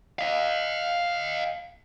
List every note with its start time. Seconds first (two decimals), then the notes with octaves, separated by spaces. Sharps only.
0.19 D#5 F5